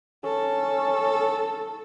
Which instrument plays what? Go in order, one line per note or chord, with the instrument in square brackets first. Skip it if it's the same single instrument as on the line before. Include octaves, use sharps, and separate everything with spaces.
[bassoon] C#4 [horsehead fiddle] A4